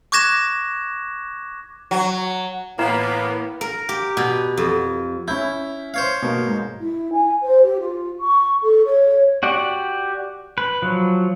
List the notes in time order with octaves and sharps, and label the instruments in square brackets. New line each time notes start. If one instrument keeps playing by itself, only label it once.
[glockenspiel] C#6 D6 F#6 G#6 A#6 E7
[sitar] F#3
[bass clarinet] A2 [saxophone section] E3 A#3 [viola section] B3 [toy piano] A#5
[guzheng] A#4
G4
B2
F2
[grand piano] C#4 B5 G6 [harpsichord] E4
[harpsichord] C5 C#5 F5
[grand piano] B2 A#3
G#2
[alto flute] E4
G#5
C5
G4
F4
C#6
A4
C#5
[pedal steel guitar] F#4 G4 D5 F#5
B4
F3 F#3